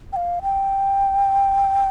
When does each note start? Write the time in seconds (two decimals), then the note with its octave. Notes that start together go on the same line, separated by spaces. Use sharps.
0.13 G5
0.16 F5
0.42 G5